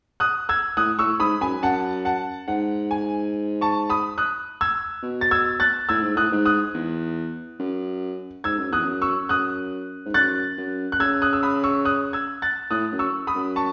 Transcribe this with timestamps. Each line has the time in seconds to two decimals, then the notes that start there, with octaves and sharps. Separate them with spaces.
0.20 D#6 F#6
0.49 E6 G#6
0.77 A2 D#6 F#6
0.98 A2 C#6 E6
1.19 G#2 B5 D#6
1.41 F#2 G#5 B5
1.63 F#2 F#5 A5
2.05 F#5 A5
2.48 G#2 F#5
2.91 G#5
3.61 A5 C#6
3.90 B5 D#6
4.18 D#6 F#6
4.61 E6 G#6
5.03 B2
5.21 A6
5.31 E6 G#6
5.60 F#6 A6
5.89 A2 E6 G#6
6.03 G#2
6.16 A2 D#6 F#6
6.32 G#2
6.46 D#6 F#6
6.74 E2
7.59 F#2
8.44 G#2 E6 G#6
8.58 F#2
8.72 E2 D#6 F#6
8.85 F#2
9.02 C#6 E6
9.29 F#2 D#6 F#6
10.06 G#2
10.14 F#2 F#6 A6
10.58 F#2
10.92 F#6
11.00 C#3 E6 G#6
11.22 D#6 F#6
11.33 E6
11.43 B5 D#6
11.64 C#6 E6
11.85 D#6 F#6
12.13 E6 G#6
12.42 F#6 A6
12.71 A2 D#6 F#6
12.92 F#2
12.99 C#6 E6
13.27 B5 D#6
13.35 F#2
13.56 A5 C#6